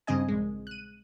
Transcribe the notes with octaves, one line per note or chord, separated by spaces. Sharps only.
G2 C#3 C4 D#5 G#5
A#1 G#3
F#6 D#7